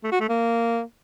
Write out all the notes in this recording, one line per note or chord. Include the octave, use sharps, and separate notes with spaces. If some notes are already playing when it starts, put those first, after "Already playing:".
A3
F#4
A3
A#3